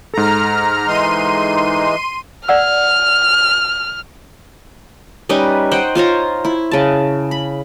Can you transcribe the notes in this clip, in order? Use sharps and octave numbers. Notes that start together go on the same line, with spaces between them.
G#2 A4 A#5 F6
E3 G#3 D#4 C6 D#7
D5 F#5 E6 F6
G3 C#4 D#4 B4
C5 D#5 F#5 G5
F4 C5 C#5 A#5
E4
C#3 A5
B5